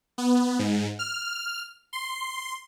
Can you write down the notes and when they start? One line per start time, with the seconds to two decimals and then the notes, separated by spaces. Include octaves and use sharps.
0.18 B3
0.59 G#2
0.99 F6
1.93 C6